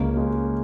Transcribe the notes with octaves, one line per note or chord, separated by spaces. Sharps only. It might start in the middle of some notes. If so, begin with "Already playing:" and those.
Already playing: C#2 A#3 C#4
G#3